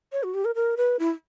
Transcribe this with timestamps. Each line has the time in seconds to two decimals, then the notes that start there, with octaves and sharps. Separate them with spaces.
0.12 C#5
0.23 F#4
0.34 G4
0.45 A#4
0.55 A#4
0.77 B4
0.99 E4